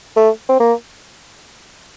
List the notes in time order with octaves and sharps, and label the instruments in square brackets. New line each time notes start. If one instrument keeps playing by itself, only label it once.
[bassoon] A3
C4
A#3